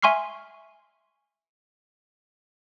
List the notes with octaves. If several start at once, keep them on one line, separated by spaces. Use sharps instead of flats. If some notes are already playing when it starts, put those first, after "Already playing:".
E5 G#5 C6 C#6 F6 C7